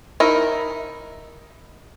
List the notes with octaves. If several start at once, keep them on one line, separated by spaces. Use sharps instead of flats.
D#4 E4 A#4